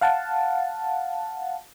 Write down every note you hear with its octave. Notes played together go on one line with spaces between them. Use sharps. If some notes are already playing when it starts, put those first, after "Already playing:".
F5 F#5 A5